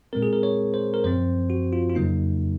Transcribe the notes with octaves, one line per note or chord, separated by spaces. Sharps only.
A#2 G#3 C4 A#4
G#4
A#4
C#5
C5
A#4
F#2 F3 C4 C5
F#4
F4
F4
F2 C#3 F#3 A#3 D#4